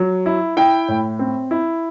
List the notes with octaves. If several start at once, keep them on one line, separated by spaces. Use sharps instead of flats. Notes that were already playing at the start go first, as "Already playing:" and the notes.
Already playing: F#3
E4
E4 G5
A2
C4
E4